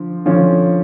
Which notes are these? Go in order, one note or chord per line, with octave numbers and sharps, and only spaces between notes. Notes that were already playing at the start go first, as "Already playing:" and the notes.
Already playing: D3 F3
D3 F3 C#4